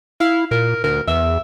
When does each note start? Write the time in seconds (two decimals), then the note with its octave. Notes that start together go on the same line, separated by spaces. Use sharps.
0.20 E4 F5
0.51 A#2 A#4
0.84 D2 A#4
1.07 E2 E5